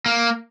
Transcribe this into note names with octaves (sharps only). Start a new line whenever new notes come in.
A#3